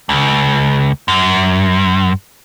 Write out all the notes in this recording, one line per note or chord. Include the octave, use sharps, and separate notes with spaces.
C#2
F#2